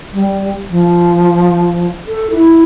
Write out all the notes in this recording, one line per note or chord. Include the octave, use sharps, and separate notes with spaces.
G3
F3
A4
E4